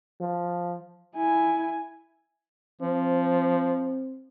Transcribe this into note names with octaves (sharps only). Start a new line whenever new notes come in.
F3
E4 G#5
F3 C4